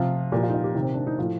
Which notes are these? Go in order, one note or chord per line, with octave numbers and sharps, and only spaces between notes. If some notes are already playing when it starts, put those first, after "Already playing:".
Already playing: C3 F3 F4
A#2 F3 G4
F4
D#4
F4
G4
C3 D#3
C4
D4
D#4
A2 F3 F4